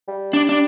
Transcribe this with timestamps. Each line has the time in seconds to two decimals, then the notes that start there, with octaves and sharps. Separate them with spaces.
0.08 G3
0.33 D4
0.49 D4